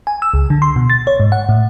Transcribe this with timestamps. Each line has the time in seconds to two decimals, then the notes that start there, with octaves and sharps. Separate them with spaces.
0.07 G#5
0.22 E6
0.34 C#2
0.50 D3
0.62 C6
0.76 B2
0.90 A6
1.07 C#5
1.20 G#2
1.32 F#5
1.49 A2